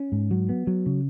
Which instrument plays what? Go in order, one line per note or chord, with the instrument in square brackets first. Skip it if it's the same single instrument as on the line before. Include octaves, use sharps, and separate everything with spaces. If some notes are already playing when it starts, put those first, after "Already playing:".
Already playing: [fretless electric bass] C#4
G#2
F#3
B3
F#3
C#3